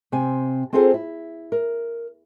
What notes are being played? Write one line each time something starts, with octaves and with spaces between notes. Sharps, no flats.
C3 C4 G#5
C4 F4 G#4 A4 C5
E4
A#4